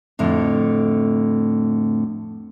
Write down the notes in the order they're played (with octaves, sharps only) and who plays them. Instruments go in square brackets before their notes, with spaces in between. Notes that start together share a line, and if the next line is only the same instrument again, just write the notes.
[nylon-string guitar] F2 A2 D3